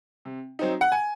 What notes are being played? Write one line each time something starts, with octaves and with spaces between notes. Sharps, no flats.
C3
F#3 C4 D#4
F#5
G#5